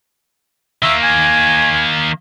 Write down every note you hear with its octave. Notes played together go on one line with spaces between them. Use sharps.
D#3 A#3 E5
G#5